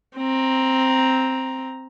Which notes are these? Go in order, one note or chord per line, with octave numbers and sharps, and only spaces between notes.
C4 A#5